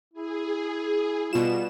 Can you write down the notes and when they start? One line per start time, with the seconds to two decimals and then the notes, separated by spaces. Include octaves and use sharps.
0.14 E4 G#4
1.33 B2 G3 F4 E7